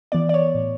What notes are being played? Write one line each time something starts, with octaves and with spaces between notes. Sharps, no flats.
E3 B3 D5
D5
C#5
A2